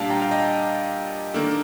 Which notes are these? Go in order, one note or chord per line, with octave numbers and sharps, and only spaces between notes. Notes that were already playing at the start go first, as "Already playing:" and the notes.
Already playing: A#2 G3 D4 F5 A5
G5 A#5
F5
D#5 G5
D#3 A#3 D4 A4